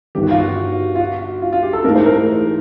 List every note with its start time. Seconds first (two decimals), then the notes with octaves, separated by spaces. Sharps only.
0.15 G1 G2 D#3 G4
0.23 F#4
0.31 F4
0.38 F#4
0.96 F4
1.00 F#4
1.42 F4
1.53 F4
1.63 G4
1.73 A4
1.84 G#2 E3 A3 A#4
1.95 C5
2.06 A#4